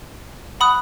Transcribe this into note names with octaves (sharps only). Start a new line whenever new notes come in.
F#5 B5 D#6 F#6